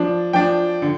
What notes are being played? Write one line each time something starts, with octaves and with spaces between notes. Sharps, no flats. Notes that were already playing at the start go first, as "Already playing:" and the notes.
Already playing: F3 D4
F3 D4 G5
D3